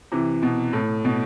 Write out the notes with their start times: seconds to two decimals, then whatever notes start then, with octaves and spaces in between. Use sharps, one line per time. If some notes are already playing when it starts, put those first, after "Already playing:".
0.12 C3 E3
0.43 B2
0.73 A2
1.05 B2